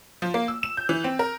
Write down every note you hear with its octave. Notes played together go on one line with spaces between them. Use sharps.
F3
A#3
E6
E7
G6
E3
C4
A#4